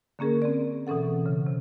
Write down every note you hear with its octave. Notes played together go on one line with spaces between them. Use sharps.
D3 A#3 C#4 G#4 A#4
C4 D5
B2 E3 C#4 A4 F#5
C#3
C3